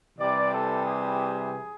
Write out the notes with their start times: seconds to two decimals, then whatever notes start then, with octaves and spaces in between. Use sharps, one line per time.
0.18 C3 E3 G3 D5
0.52 A4
0.86 G#4